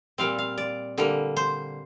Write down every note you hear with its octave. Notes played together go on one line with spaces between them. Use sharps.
A#2 G3 C4 F5
F5
D5
D3 G3 A#3
C5